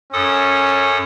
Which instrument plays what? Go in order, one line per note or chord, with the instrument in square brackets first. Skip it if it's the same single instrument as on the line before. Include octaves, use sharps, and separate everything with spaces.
[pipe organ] F#2 A4 D#6 [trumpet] C#4